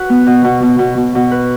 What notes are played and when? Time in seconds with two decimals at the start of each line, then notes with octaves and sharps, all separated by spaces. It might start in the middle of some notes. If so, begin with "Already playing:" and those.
Already playing: F#4 B4
0.10 B3
0.26 B2
0.45 B2
0.63 B2
0.79 B2
0.97 B2
1.15 B2
1.31 B4